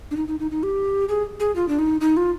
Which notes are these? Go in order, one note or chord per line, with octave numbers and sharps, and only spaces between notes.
D4
D#4
D#4
D#4
D#4
G4
G#4
G#4
F4
D4
D#4
D#4
F4